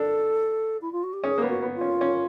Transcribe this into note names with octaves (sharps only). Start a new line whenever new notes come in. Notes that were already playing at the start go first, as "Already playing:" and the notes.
Already playing: D4 A4
E4
F4
F#4
G4
C#4 G#4
A#3
B3
F#4
B3
F4
C#4
C#4